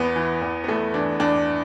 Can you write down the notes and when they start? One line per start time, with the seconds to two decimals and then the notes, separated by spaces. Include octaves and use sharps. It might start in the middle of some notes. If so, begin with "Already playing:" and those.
Already playing: E2 B3
0.16 E3
0.42 E2
0.64 B3
0.68 E2 A3
0.94 E3 D4
1.20 E2 D4